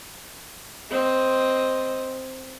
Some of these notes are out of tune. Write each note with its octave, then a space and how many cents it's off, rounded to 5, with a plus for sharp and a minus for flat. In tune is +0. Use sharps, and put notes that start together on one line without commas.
C4 +0 D#5 +0